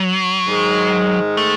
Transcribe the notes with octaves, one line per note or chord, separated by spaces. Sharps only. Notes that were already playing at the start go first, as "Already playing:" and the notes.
Already playing: F#3
G#2 D#3 G#3
A3